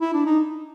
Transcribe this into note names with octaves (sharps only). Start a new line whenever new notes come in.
E4
D4
D#4